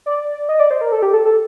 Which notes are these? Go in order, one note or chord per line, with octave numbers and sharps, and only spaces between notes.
D5
D#5
D5
C5
A#4
A4
G4
A4
A4